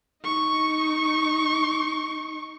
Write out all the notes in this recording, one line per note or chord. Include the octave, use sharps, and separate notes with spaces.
D#4 C#6